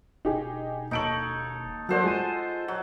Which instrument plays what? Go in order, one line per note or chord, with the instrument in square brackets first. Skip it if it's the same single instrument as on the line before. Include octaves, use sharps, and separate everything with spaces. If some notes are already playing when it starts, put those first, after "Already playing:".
[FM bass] E1 [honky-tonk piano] D#4 G4 G#4
[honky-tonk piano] D#2 D7 F#7 [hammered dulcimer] D#4 A4 C#5
[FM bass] F#3 [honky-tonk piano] F#4 A#4 D5 [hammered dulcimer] A4 C5 F#5
[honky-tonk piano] G#3 G#5 D#7 [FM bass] F4
[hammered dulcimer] F#3